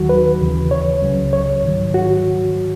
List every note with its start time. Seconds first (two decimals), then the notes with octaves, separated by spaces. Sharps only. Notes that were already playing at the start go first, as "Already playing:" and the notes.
Already playing: D#2 D#3 F#3 F#4
0.09 B4
0.40 D#2 C#3 E3
0.71 C#5
1.02 C#2 C#3 F#3
1.33 C#5
1.64 G#2 D#3 F#3
1.94 F#4